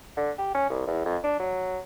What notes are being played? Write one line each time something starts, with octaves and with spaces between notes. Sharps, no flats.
D3
G4
C#4
C2
E2
F2
D4
F#3